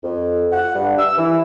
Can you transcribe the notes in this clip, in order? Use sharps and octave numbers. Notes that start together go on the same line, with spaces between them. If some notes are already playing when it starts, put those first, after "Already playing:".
F2
F#5
G2
E6
E3